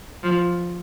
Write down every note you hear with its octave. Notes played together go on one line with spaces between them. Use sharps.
F3